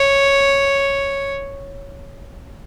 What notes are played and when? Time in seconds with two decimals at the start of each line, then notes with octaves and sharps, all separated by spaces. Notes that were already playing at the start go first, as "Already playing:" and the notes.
Already playing: C#5